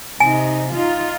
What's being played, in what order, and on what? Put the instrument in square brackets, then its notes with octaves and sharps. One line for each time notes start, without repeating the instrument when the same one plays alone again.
[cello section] C3 D#4 [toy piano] G#5
[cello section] D#4 F4